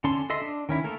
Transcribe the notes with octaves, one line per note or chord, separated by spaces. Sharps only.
D3 C#4 A5 C6
A4 D#5 E5 C6
D4
D#3 C#4 E4
A3 A#3 A4 A#4